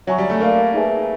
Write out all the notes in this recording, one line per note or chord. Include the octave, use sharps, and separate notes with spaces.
F#3 C#5 E5 G#5 C#6
G3
A3
A#3 A#4 D5 F5
D#4 G#4 B4 E5 G#5